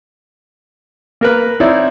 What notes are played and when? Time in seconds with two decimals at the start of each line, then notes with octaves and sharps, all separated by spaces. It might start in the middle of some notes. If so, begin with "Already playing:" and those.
1.21 A#3 A#4 B4
1.60 C4 D#4 E4 C#5 D5